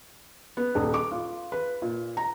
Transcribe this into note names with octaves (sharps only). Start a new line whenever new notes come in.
B3
D#1
D6
F4
B4
A#2
A#5